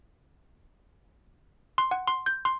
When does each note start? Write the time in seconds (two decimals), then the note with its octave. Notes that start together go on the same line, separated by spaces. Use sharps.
1.78 C6
1.91 F#5
2.07 C6
2.26 G6
2.45 C6